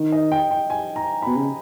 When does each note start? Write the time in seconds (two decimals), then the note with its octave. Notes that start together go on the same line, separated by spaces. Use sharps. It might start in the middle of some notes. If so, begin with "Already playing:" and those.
Already playing: D#3
0.12 D#5
0.32 G5
0.51 G5
0.70 G#5
0.96 A#5
1.22 B2 B5
1.36 C#3